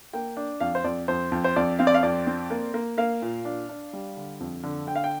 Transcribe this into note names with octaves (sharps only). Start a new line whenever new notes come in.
A#3 G5
D4
F2 F5
C5
F2 D5
F2 C5
F2
C5
F2 D5
C4 F5
D5
F5
F2 D5
C4
A#3
A#3
A#3 F5
A#2
D4
D4
G3
D3
F2
D3
D3 G5
F5
G5